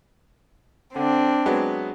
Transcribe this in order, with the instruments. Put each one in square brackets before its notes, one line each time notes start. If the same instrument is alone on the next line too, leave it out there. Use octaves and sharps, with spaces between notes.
[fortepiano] D3 [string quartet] C4 D4
[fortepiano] F#3 G#3 B3